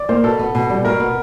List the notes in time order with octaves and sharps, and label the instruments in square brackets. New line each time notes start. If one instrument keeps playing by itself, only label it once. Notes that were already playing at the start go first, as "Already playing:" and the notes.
Already playing: [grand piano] D5
[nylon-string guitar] A#3 [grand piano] C5
[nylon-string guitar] B2 [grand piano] A4
[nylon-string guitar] B3
B2
G3
[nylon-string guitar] B2 [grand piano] A#4
[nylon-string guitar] B3